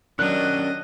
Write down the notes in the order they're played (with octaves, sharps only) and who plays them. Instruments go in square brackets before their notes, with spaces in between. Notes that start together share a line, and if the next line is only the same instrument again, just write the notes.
[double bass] F#3 [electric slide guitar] C#4 A#4 D5 [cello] D4 D#5 [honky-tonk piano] F#6